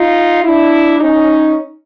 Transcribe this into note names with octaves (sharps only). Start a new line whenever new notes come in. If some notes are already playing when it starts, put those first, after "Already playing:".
Already playing: D#4 F4
D4 E4
C#4 D#4